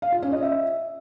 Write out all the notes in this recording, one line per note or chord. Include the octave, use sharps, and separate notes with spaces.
F5
F4
C#4
D#5
E5